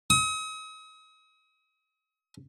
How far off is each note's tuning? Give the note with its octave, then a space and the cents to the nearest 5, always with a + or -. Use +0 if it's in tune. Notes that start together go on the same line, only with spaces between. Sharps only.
D#6 +40